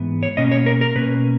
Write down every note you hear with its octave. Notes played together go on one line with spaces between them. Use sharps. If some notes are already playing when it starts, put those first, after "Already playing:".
Already playing: G#2 E3 B3
C#5
B2 A#3 C#4 D#5
C#5
A#4
A#4
B2 A#3 C#4 B4